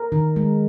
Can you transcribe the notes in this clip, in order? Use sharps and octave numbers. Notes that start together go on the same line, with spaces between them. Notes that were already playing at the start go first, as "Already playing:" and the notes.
Already playing: A#4
D#3
G#3